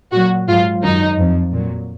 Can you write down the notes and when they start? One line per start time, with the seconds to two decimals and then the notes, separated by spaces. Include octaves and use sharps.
0.12 A#2 F#3 F#4
0.48 G#2 F#3 F4
0.83 F#2 D#3 F#3 D#4
1.19 F2 F3
1.54 A#2 F#3